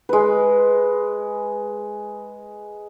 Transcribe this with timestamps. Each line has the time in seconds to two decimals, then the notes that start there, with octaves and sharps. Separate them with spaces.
0.09 G#3 B4